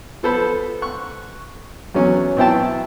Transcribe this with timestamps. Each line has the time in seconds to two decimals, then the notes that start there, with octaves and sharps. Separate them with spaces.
0.23 F3 B3 A4 C5 B5
0.82 C#6 F#6
1.95 E2 F#3 C#4
2.36 B1 C4 E4 C5 G5 A5